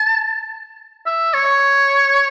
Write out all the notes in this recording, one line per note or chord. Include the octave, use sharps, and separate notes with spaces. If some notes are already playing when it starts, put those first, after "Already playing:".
Already playing: A5
E5
C#5